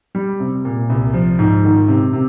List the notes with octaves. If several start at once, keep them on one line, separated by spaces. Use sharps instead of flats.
G3
C3
A#2
C2
F3
G#2
D#3
C3
C3